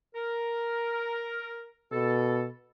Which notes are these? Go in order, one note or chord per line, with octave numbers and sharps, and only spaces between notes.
A#4
B2 A4